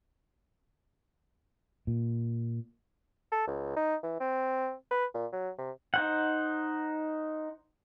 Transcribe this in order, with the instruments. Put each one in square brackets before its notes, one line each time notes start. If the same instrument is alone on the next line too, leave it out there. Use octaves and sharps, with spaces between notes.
[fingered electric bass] A#2
[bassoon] A4
C#2
D#4
E3
C4
B4
A#2
F#3
C3
[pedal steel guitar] D#4 C5 F#5